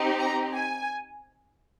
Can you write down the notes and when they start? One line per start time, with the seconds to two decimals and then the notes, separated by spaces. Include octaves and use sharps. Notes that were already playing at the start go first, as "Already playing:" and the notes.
Already playing: C4 D#4 G4
0.20 A#5
0.55 G#5